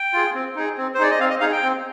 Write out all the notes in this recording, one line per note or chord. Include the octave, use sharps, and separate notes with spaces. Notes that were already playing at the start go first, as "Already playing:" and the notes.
Already playing: G5
F4 G#4
C4
D#4 G#4
C4
C5
D#4 G#4 D5
D#5
C4 F5
D#5
D#4 G#4 F5
G5
C4